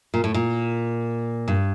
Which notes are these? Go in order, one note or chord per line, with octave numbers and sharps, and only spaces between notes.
A#2
A2
A#2
G2